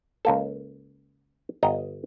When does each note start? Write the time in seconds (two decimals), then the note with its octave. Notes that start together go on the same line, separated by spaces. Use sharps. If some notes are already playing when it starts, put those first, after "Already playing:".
0.25 C#2 A#3 A4
1.63 G1 D#5 A#5